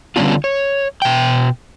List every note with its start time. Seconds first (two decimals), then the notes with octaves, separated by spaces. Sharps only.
0.16 D3 G3 B3 C#4 D4 F4
0.44 C#5
1.02 B2 G5